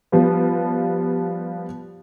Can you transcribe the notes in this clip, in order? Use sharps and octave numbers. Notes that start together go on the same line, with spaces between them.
F3 G3 B3